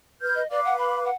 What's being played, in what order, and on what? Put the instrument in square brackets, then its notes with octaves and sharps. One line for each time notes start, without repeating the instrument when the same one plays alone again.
[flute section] B4 F6 G6
[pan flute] D#5
[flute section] B4 F5 D6 [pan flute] D5
[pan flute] F#5
B5
F#5